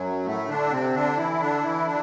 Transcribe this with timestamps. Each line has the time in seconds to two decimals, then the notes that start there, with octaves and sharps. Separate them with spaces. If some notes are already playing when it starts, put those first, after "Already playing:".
Already playing: F#2 F#3
0.25 A2 A3
0.48 D3 D4
0.71 C3 C4
0.94 D3 D4
1.17 E3 E4
1.40 D3 D4
1.63 E3 E4
1.86 D3 D4